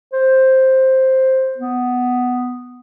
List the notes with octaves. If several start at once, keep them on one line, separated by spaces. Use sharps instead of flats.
C5
B3